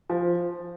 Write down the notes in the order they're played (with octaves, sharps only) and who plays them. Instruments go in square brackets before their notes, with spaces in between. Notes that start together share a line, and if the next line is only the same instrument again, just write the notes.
[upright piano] F3